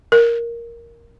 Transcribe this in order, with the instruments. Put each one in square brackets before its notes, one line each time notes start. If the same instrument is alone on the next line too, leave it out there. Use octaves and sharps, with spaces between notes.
[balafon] A#4